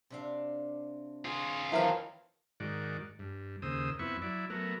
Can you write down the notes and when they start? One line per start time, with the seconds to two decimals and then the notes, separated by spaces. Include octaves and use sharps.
0.10 C3 D4 F5
1.25 F4 G#4
1.72 E2 D#3 F3 F#3 C4 E4 B4 F5
2.60 G#2 D#3 F#4 D5
3.19 G2
3.62 D#2 C#3 C5 D#6 E6
3.99 F2 B3 E4 C#6
4.22 F#3 E4 D5
4.50 F#3 A3 B3 A#4